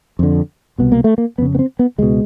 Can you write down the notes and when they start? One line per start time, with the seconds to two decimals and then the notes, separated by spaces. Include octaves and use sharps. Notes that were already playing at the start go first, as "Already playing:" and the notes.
0.19 F2 D3
0.78 C2 B2 B3
0.92 A#3
1.04 A3
1.18 A#3
1.38 F2 C#3 B3
1.55 B3
1.59 C4
1.79 B3
1.98 C#2 B2 G#3